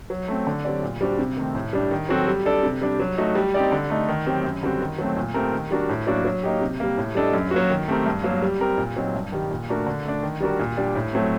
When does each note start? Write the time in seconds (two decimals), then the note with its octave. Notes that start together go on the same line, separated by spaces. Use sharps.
0.10 F#3
0.28 A3 C4
0.47 D3
0.65 F#3 C4 G4 D5
0.83 A#2
1.01 G3 D4 F#4 C5
1.19 C3
1.37 D#3 A3 C4
1.55 A2
1.73 G3 D4
1.91 D#3
2.09 F#3 C4 F#4 A4
2.27 G3
2.45 D4 A4 D5
2.63 C3
2.81 G3 D4
3.00 F#3
3.18 A3 D#4 F#4
3.35 G3
3.54 C4 D#4 G4 D5
3.72 D3
3.90 A3 D#4
4.08 D#3
4.26 F#3 C4 G4
4.44 F#2
4.63 D3 G3 C4 F#4
4.81 D#3
4.98 F#3 A3 C4
5.17 A#2
5.34 A3 C4 G4 A#4
5.52 D#3
5.71 G3 D4 F#4 A#4
5.89 A2
6.07 F#3 A#3 D4 F#4
6.25 F#3
6.43 A#3 D#4 G4
6.61 C3
6.80 G3 A#3
6.98 A2
7.15 G3 D4 A4 D#5
7.33 F#2
7.51 F#3 A#3 F#4
7.70 D#3
7.88 A3 C4 G4 A#4
8.06 G2
8.24 F#3 A#3
8.42 G3
8.60 C4 G4 A#4
8.78 A#2
8.96 F#3 C4 D#4
9.15 G2
9.32 D#3 G3
9.51 A#2
9.69 A3 D4 F#4 A#4
9.86 D3
10.05 A3 D4
10.23 D#3
10.40 G3 D4 F#4 A#4
10.59 A#2
10.77 G3 D4 G4
10.95 A2
11.13 F#3 A3 C4